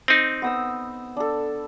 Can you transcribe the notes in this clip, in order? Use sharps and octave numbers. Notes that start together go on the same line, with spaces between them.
C4 D#4
B3 D#6 E6
D4 A4